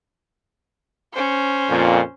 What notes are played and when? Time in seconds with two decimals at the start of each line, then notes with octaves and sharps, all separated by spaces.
1.14 C#4 C5
1.69 F2 A#2